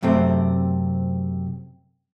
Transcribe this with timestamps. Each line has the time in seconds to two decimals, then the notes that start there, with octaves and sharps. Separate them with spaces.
0.03 F#2 C3 A3 C4